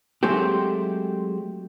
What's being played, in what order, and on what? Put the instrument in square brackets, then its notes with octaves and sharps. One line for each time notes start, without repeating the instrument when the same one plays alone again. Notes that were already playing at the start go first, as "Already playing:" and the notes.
[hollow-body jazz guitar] F#3 G#3 A3 C4 G4